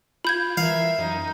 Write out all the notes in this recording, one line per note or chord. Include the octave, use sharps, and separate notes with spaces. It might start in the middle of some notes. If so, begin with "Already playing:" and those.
F4 B5 G6 G#6
E3 A#4 E5 F5
F#2 D#4